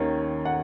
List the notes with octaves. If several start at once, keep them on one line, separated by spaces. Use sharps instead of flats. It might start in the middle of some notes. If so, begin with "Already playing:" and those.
Already playing: D#2 D#3 A#3 C#4
F#5